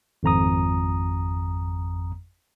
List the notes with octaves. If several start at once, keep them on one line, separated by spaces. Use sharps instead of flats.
G#1 F2 A#5 D#6